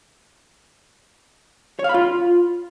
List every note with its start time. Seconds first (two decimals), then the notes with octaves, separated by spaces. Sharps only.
1.79 C#5
1.84 F5
1.89 B5
1.94 F4